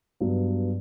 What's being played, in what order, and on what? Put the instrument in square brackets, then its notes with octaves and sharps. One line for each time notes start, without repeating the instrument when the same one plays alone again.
[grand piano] G2 F#3 B3